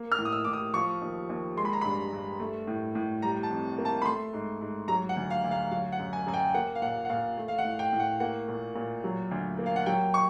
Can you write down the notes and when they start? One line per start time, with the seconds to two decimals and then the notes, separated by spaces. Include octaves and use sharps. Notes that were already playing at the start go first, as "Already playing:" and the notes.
Already playing: A#3
0.12 F6
0.18 A2
0.25 D#6
0.32 E6
0.44 A2 D6
0.53 D#6
0.74 F3 C#6
1.01 D#2
1.29 D#2
1.57 G#3 C6
1.65 B5
1.73 A#5
1.81 G2 B5
2.12 G2
2.40 A3
2.67 A2
2.95 A2
3.22 G3 A#5
3.43 A5
3.50 F2
3.78 A#3
3.85 A5
4.02 B5
4.05 A3 C6
4.33 G#2
4.61 G#2
4.88 F#3 A#5
5.09 F#5
5.16 D2
5.30 F5
5.44 D2
5.51 F5
5.71 F#3 F5
5.92 F#5
5.99 F#2
6.13 G#5
6.27 F#2 G#5
6.34 G5
6.54 A#3 F#5
6.75 F5
6.82 A#2 F#5
7.05 F#5
7.09 A#2 F5
7.38 A3
7.48 F5
7.58 F#5
7.65 A2
7.79 G5
7.93 A2
8.00 F#5
8.20 A#3 F#5
8.48 A#2
8.76 A#2
9.04 F#3
9.31 D2
9.59 A#3
9.66 F5
9.76 F#5
9.86 F#3 G5
10.14 C#6